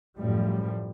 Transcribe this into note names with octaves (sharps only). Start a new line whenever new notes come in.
F#2 A2 F3 G3